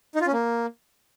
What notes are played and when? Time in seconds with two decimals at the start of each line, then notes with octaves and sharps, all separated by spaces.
0.15 D#4
0.21 F4
0.27 C#4
0.33 A#3